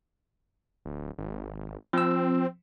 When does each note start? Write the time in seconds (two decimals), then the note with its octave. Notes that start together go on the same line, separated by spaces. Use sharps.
0.85 D1
1.18 G#1
1.93 F3 C4 E6